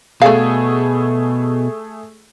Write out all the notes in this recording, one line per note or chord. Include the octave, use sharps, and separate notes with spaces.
B2 A3 G#4 D5 F5